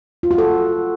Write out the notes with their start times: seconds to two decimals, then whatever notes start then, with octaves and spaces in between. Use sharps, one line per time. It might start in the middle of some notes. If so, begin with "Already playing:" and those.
0.23 F4
0.31 F#4
0.38 A4